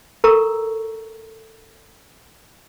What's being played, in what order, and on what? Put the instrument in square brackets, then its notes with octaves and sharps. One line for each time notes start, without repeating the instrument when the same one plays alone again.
[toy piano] A4 A#4 A#5 C#6 E6